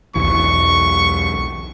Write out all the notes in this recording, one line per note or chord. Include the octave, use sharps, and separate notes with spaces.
B1 E2 E3 C#6